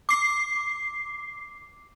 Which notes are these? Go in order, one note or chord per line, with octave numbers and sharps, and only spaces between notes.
D6 C7